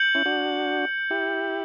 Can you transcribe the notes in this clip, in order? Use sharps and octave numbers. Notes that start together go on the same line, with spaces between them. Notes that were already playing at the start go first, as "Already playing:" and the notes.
Already playing: G6 C#7 F#7
C#4 E4
D4 F#4
E4 G4